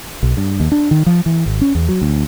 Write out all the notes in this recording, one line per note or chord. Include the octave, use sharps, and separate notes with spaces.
B1
G2
D#2
D4
D#3
F3
E3
G#1
C#4
E2
F#3
D2